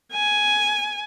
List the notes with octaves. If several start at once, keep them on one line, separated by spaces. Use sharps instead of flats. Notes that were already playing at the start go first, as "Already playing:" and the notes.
G#5